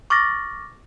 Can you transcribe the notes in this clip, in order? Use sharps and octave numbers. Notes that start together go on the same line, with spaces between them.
C#6 D6 F6 A6 A#6